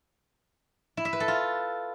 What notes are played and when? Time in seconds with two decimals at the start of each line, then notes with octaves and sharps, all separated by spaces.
0.97 E4
1.05 E5
1.13 B4
1.20 A4
1.28 F4